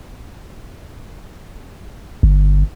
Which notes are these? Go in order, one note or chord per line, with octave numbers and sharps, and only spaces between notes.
G1